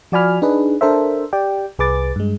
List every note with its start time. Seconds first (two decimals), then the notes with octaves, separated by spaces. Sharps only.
0.12 F3 F#4 D5 G#5 B5 F6
0.42 D4 D#4 G#4 B4
0.81 D4 A4 A#4 C5 E5
1.33 G4 D5 G5
1.79 C2 G#4 B4 D6 A6
2.16 G2 G#3